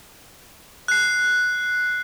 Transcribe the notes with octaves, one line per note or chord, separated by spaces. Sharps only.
F#6 C7